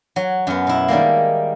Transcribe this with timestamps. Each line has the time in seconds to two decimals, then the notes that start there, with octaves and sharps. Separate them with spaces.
0.16 F#3
0.47 F#2 B3
0.67 B2 E4
0.88 D#3 G3 G#3 A#3